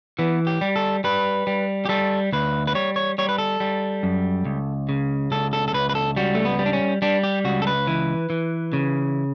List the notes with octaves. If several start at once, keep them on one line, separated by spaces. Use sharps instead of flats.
E3 B3
G4
G3
A4
G3 B4
G3
G4
G3 A4
D2 B4
B4
G3 C#5
C#5
G3 C#5
B4
A4
G3
F#2
C#2
C#3
C#2 A4
A4
A4
C#2 B4
B4
A4
G3 F#4
A3
B3
G3
D4
C#4
G3 D4
G4
C#2 F#4
A4
B4
E3
E3
C#3